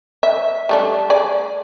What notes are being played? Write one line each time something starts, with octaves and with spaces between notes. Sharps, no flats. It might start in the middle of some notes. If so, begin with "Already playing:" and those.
E5
G3 A3 D4
G#4 D5